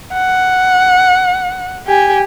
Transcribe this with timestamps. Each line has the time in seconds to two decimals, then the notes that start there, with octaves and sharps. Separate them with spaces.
0.13 F#5
1.87 G4 G#5